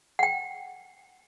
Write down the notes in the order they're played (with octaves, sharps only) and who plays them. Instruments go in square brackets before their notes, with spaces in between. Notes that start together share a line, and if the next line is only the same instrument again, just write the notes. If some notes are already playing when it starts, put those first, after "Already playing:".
[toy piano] F#5 G5